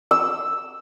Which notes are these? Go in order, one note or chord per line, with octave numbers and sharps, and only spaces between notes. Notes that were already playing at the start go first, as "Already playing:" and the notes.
E6